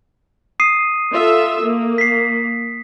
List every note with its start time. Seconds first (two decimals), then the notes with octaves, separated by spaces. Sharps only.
0.60 D#6 C7 D#7
1.13 F4 A4 E5
1.61 A#3
1.98 B6 C7